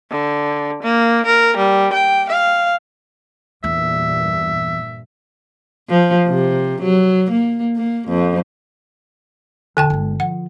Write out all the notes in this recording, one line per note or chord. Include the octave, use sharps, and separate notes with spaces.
D3
A#3
A#4
G3
G5
F5
E2 G2 A#2 E5
F3
C3
F#3
A#3
A#3
F2
E1 D3 G5 A5
G1 G#3
F3 F#5